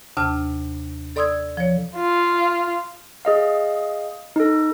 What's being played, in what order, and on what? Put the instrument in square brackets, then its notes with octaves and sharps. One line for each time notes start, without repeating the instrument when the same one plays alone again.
[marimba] D#2 C3 D4 A5 F6
A4 D5 C6 D#6 E6 G#6
F3 C#5
[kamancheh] F4
[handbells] G#4 D#5 F5
D#4 A4